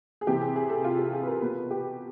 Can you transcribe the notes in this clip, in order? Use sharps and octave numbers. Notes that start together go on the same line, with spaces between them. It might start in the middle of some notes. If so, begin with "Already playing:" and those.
G#4
C3 E3 G4
G#4
G#4
A4
F4
G4
G#4
B4
A#4
B2 B4
G4